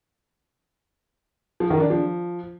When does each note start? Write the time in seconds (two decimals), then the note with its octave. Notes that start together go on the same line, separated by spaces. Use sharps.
1.60 F3
1.70 D#3
1.80 D4
1.90 F3